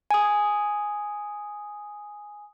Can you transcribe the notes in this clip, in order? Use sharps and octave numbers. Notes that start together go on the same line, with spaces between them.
G#5 D#6